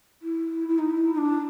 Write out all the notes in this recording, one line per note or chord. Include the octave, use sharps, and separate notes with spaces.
E4
E4
D#4
E4
D#4
D4